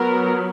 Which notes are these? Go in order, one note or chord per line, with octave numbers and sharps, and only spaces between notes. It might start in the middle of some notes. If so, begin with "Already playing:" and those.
Already playing: F#3 B3 A#4